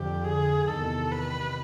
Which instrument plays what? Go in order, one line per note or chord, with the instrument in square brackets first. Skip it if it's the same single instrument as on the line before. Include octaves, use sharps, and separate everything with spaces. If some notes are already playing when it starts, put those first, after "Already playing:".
Already playing: [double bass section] F2 D3 F3 [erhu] G4
[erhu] G#4
[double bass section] E2 C3 D#3 [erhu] A4
[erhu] B4